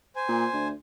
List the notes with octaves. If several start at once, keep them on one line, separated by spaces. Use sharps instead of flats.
C5 G#5
A#2
D2